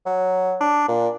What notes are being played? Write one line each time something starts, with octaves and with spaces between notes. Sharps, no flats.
F#3
D4
A#2